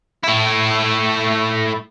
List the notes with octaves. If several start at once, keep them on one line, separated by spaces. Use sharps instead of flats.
A3 E4